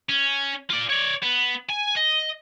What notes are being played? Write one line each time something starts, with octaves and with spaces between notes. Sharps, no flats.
C#4
F4 D5
C#5 D5
B3
G#5
D#5